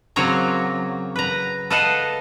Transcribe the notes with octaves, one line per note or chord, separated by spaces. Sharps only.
C#3 F#3 A#3 C4 C#5 A#5
B4 A#5
A4 B4 D#5 F5 F#5 A5